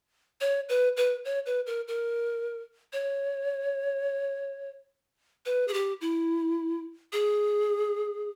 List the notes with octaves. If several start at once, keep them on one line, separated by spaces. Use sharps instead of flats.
C#5
B4
B4
C#5
B4
A#4
A#4
C#5
B4
G#4
G4
E4
G#4